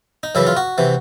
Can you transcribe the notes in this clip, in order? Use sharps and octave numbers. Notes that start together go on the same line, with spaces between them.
D#4
F#2 C#3 E3 E4
F4
F#4
C3 E3